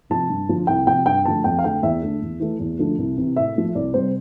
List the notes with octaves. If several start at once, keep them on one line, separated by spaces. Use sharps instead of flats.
C3 F3 A5
G2
D3 F3
C2 G5
C3 F3 G5
G2 G5
D3 F3 A3 A5
F2 G5
F5
D3 A3 G5
E2 E5
D3 A3
E2
E3 A3
E2
D3 F3 A3
C2
C3 E3
A2 E5
F3 A3
C2 D5
C3 G3 C5